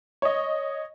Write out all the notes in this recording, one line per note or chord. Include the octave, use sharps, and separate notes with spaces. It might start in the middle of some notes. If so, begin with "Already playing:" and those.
C#5 D#5